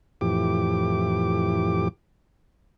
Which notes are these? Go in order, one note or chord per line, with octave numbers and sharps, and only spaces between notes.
F2 A2 E3 G4 D6